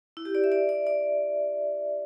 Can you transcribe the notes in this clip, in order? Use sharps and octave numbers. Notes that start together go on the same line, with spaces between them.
E4
G4
D5
E5
D5
D5
D5